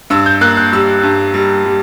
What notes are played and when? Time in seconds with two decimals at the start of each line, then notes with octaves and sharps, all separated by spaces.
0.10 G2 E6
0.26 G6
0.41 A#3 F#6
0.57 F#6
0.73 G3 E6
1.03 G2
1.34 G3
1.65 G3